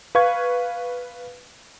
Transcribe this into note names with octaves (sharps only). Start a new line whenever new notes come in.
B4 F5 C#6 G#6